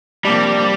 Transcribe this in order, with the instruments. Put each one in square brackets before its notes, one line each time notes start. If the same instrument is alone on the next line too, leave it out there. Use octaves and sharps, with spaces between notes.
[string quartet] C3 F3 A#3 D4 [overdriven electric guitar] G3